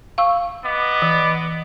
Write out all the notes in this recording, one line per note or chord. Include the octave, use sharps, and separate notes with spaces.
F5 C#6 E6
B3 D#5 D6
E3